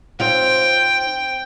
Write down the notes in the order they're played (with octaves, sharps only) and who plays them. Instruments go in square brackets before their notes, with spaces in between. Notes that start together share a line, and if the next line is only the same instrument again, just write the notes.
[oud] C4 D#4 F4 [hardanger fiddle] G5